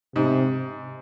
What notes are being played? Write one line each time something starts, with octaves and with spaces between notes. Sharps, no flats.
G#2 C3